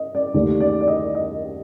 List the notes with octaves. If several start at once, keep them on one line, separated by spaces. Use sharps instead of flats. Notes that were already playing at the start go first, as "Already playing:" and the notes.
Already playing: D#5
D5
D#2 D#3 A3 D5
D5
D5
D#5
D#5